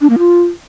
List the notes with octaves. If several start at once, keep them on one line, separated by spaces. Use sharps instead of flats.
D4
A#3
F4